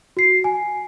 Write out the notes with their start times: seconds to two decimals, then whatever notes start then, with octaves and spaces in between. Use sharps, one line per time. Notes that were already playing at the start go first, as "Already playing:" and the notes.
0.17 F#4 C7
0.44 G#5